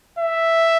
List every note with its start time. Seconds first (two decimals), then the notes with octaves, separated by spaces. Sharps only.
0.19 E5